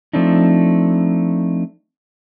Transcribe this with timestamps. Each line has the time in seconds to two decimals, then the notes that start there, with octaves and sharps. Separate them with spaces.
0.13 F3 A3 C4 D4 D#4